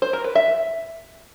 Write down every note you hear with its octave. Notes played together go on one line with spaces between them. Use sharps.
C5
A#4
B4
E5